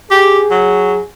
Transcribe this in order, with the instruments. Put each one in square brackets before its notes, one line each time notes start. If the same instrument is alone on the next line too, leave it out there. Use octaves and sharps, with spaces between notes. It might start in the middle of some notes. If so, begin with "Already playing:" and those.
[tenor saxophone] G4 [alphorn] G#4
[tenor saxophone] F#3